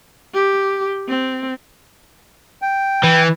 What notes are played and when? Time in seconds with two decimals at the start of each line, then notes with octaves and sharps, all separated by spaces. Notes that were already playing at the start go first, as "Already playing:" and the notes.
0.34 G4
1.08 C4
2.62 G5
3.03 E3